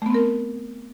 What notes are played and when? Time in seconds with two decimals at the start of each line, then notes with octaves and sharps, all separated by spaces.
0.02 A3
0.06 B3
0.10 C4
0.15 A#4